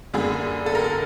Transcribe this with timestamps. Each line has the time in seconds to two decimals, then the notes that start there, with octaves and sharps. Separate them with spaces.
0.14 F#2 D3 G3 A#3 G#4
0.66 A4
0.75 A#4
0.84 A4